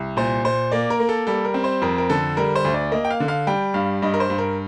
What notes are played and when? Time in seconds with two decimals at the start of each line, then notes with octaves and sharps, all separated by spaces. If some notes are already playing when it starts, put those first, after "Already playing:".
Already playing: C2
0.17 A#2 C5
0.44 A#2 C5
0.72 A#3 D5
0.90 A#4
1.00 A#3
1.09 A4
1.27 G3 A4
1.45 A#4
1.54 C4
1.64 C5
1.82 F2 A#4
1.98 A#4
2.10 D3 A4
2.37 G3 A#4
2.56 C5
2.65 D2
2.74 D5
2.92 A#3 D#5
3.05 G5
3.10 F5
3.20 D3
3.28 F5
3.47 G3 G5
3.74 G2 F5
4.02 G2 D#5
4.14 A#4
4.20 C5
4.30 G2
4.38 A#4